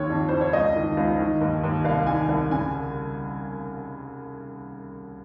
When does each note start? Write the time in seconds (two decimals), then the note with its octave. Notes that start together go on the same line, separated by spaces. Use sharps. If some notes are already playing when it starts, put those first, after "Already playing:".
Already playing: D#2 D#3 C#5
0.10 F2
0.29 F2 C5
0.41 C#5
0.53 C#2 D#5
0.76 D#3
0.97 C#2
1.20 D#3
1.41 D#2
1.64 D#2
1.85 C2 F5
2.07 D#3 G#5
2.29 C2
2.51 C#3 G#5